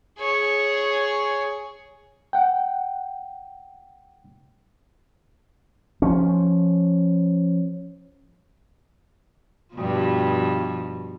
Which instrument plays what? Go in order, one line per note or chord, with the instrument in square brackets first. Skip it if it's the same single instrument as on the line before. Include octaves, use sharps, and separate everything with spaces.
[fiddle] G#4 C#5
[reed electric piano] F#5 G5
[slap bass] F3 C#4
[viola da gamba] G2 B2 F3